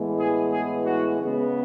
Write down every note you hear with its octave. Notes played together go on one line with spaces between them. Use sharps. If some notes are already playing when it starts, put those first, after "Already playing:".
Already playing: A2 E3 G#3 B3
G#4
G#4
F#4
C#3 G#3 B3